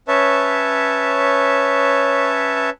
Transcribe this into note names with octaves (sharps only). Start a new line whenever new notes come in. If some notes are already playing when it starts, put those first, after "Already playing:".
C#4 B4 C#5 E5 A5